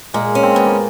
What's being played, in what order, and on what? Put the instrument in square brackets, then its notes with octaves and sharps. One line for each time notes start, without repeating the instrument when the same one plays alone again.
[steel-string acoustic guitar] A#2 [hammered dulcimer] G#3 A#3
[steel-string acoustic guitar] C#4
[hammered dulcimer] C4
[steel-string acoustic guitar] A#2 [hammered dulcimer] B3
[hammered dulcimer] A#3